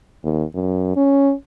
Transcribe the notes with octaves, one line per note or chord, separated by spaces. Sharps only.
D#2
F#2
C#4